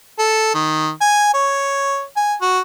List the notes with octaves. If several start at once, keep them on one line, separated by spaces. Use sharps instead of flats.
A4
D#3
G#5
C#5
G#5
F#4